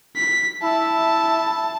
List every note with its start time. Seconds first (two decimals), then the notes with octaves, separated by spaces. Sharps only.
0.16 B6
0.63 E4 E5 A5